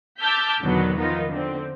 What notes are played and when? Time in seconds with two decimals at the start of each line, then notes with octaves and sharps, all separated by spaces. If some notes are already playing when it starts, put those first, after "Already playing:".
0.19 A5 D6 E6 F6 G6 B6
0.62 E2 B2 D3 D#3 F#3 B3
0.97 D#3 F3 B3 D#4 F4
1.29 D3 C4